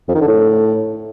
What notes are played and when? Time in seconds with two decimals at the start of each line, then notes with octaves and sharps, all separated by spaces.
0.08 F2
0.15 D#3
0.21 D3
0.27 A2